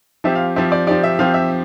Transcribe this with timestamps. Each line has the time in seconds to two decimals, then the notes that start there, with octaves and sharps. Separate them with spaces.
0.24 F3 C4 G4 E5
0.35 F5
0.56 F3 C4 G4 E5
0.72 D5
0.87 F3 C4 G4 D5
1.03 E5
1.19 F3 C4 G4 F5
1.34 E5